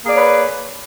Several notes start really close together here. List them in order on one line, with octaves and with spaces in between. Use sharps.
A#3 G#4 D5 C#5 B4